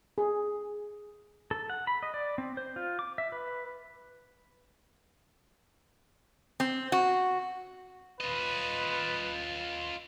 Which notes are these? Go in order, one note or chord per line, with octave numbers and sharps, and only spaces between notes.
G#4
A4
F#5
B5
D#5
D5
C4
C5
F4
D6
E5
B4
C4
F#4
F4 B4 D#5